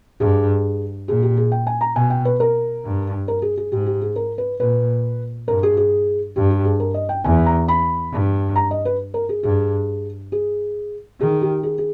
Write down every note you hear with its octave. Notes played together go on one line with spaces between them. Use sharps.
G2 G#4
A#2 G#4
G4
G#4
G5
G#5
A#5
B2 G#5
G5
B4
A#4
G2
A#4
G#4
G#4
G#2 G4
G4
G#4
A#4
B4
A#2 B4
G2 A#4
G#4
G#4
G2 G4
G4
G#4
A#4
D#5
G5
E2 G#5
A#5
B5
G2
A#5
D#5
B4
A#4
G#4
G2 G#4
G#4
D#3 G#4
G4
G#4
G#4